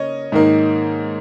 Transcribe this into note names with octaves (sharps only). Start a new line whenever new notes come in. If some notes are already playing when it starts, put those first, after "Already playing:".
Already playing: C#3 A#3 C#4 C#5 D#5
G#2 D#3 A#3 D#4